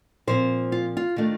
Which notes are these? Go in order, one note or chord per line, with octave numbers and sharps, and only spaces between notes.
A#2 F3 C4 C5
F4
F4
D#3 A3 D4 F4